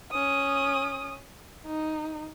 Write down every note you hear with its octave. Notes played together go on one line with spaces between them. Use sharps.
C#4 D#6
D#4